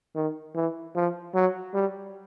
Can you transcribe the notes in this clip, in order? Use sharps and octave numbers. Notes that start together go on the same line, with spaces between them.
D#3
E3
F3
F#3
G3